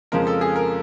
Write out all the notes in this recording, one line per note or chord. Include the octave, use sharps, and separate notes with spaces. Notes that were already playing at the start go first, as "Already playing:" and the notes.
F2 C#3 F3 G#3 A#4
A4
G#4
A#4